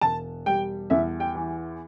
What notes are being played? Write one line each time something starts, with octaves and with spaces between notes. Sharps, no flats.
E1 A5
G3 G5
E2 E5
G5
E3